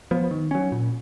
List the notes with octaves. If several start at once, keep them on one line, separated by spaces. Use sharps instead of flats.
F3 B3
D#3
F#3 C#4
A#2